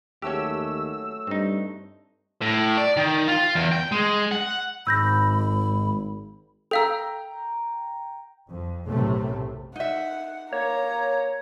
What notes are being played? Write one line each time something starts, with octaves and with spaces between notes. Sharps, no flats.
D#2 F#3 A3 C#4 F#4 G4 E6
G2 C4 D#4
A2
D5
D#3
F4
E2
G5
G#3
F#5
G#1 G#2 B5 E6 G6 A#6
A4 F5 G5 A#5 E6
F2
B1 F#2 A2 C3 A3
D#4 E5 F#5
A#3 C#5 A#5